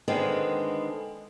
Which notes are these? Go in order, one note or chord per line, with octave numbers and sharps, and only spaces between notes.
D3 D#3 G#3 B3 C4